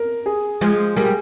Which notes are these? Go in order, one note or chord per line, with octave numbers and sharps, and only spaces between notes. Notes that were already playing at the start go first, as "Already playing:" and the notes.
Already playing: A#4
G#4
F3 G#3
G3 A#3 G#4